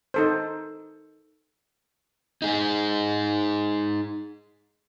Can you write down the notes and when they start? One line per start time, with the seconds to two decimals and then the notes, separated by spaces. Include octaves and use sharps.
0.14 D#4 A4 C5
2.42 D#4 G#4